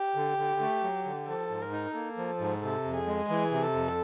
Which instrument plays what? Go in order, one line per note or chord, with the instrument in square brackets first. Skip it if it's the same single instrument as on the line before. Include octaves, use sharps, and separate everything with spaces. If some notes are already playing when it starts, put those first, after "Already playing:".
Already playing: [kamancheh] G4
[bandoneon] D3
D3
A3
F#3
D3
[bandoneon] F3 [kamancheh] A4
[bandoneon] G#2
[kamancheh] A#4
[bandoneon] D#4
[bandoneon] A#3 [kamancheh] A4
[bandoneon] F3
G#2
[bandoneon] C3 [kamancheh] A4
[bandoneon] F2
[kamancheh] G#4
[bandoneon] G#3
[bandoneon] E3 [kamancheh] G#4
[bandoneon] C3
[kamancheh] A4
[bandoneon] F2